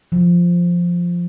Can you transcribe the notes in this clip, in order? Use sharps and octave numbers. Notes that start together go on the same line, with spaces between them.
F3